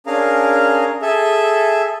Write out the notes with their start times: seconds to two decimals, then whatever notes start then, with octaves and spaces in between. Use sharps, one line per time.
0.06 C#4 D4 G#4 A#4 F5 A#5
1.02 G#4 A4 E5